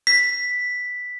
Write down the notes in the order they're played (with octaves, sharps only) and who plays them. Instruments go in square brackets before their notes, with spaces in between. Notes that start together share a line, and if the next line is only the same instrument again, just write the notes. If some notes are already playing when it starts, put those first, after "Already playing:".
[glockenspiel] B6